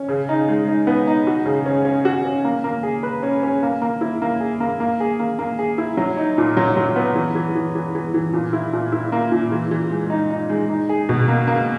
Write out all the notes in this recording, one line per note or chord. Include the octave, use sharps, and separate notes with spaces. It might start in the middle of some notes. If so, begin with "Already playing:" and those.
Already playing: C#4
C#3
D#4
G#3
D#4
B3
D#4
F#4
C#3
C#4
C#4
F#4
C#4
A#3
A#3
G#4
B4
C#4
C#4
A#3
A#3
E4
A#3
G#4
A#3
A#3
G#4
A#3
A#3
G#4
E4
F#3
D#4
A#2
F#3
F#3
B3
E3
E3
E3
E3
E3
E3
A#2
E4
A#2
E4
A#3
A#2
E3
E3
G#3
D#4
D#4
G#3
D#4
G#4
B2
A#3
A#3